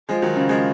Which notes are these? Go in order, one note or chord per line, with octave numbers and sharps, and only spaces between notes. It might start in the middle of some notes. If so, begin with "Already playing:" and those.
F3 G#3
D#3 F#3
C#3 F3
F3 G#3